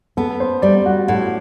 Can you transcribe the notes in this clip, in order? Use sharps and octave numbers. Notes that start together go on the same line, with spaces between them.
B3 A4
C5
G3 D5
F#4
A2 F#4